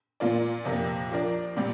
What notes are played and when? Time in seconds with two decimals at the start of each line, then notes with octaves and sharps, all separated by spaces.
0.20 A#2 A#3 F4 D5
0.65 F2 C3 A#3
1.11 F3 D4 A#4 D5
1.57 A#2 G3 C4 G4